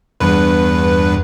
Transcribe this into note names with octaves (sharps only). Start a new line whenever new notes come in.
E2 G2 B4